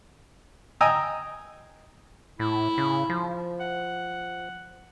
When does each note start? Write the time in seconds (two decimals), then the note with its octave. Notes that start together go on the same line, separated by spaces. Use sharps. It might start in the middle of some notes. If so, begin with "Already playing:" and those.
0.81 D#5 G5 G#5 A#5 D#6 E6
2.39 A2 E4
2.78 C#3
3.10 F3
3.60 F#5